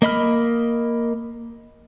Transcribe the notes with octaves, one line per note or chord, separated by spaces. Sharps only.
A#3 D#5 B5 F6